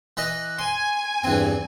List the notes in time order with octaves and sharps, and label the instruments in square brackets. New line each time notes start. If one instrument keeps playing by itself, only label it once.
[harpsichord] E3 B4 D#5
[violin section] G#5 [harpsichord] C6
[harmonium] E2 G2 [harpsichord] E3 C4